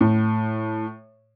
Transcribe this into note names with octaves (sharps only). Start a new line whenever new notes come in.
A2